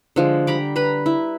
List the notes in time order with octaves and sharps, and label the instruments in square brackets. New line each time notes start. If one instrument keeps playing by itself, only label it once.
[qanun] D3 F3 G#3
G3 A#5 B5 D6
B4 A#5 B5
E4